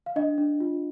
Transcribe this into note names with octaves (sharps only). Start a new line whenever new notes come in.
F5
D4 D#5
D4
F4